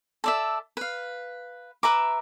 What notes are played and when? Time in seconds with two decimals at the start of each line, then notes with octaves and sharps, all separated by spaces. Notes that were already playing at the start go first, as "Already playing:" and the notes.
0.24 A4 D5 E5
0.77 B4 F5
1.83 B4 E5 A#5 D6